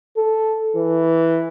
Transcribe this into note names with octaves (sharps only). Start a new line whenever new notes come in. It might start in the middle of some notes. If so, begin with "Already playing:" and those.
A4
E3